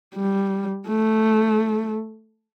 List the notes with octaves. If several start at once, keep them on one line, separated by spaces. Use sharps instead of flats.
G3
A3